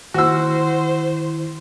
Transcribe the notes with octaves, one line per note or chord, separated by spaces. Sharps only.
D#3 E4 F#4 C5 E6